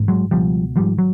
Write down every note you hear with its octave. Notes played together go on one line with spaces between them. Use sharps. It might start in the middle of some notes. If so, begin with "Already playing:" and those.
Already playing: A1 G#2
F#3 G#3
C#2 B2 F3 G3
G#1 G#2 F3 G3
F#3